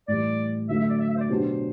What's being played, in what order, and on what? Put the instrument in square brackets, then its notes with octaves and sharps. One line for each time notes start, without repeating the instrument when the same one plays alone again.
[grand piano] A2 E3 G3 [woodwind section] D5
[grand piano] D3 F#3 A3 [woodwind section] E5
[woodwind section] E5
D5
E5
E5
C5
D5
[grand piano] B2 F#3 B3 D4 G4 [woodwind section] C5